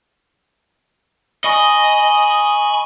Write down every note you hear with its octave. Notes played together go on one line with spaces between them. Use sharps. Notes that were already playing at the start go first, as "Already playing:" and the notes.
D#5 G#5 B5 C#6